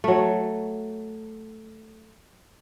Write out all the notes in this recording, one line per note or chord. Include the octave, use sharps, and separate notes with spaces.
F#3 A3